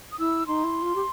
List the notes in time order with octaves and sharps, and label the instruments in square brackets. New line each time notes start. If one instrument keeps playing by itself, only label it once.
[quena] D#6
[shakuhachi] E4 [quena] E6
[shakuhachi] D#4 [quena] C6
[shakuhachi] E4
F4
G4